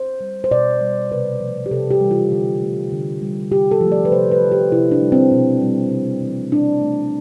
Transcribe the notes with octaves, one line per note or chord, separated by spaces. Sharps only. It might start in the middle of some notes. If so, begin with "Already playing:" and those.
Already playing: C5
G3
C5
B2 D5
G3
C3 B4
F3 A3
G4
C3 A4
G4
E3 G3
F4
D3
A3
D3
G3
C3 G4
A4
F3 A3
D5
B4
C3 C5
B4
G3
G4
C3 E4
D4
G3
C4
B2
G3
C3
E3 A3
B2 D4
A3